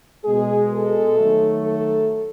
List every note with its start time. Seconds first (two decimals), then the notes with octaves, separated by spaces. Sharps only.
0.25 B2 G#3 G#4
0.72 A4
1.17 D#3 F#3 A3
1.64 A4